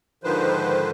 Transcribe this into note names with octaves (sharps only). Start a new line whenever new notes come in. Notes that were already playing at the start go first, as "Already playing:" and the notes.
G#2 D3 D#3 F3 B4 C5